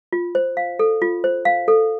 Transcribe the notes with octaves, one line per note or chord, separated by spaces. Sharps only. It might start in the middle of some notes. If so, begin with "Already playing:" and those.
F4
C5
F5
A4
F4
C5
F5
A4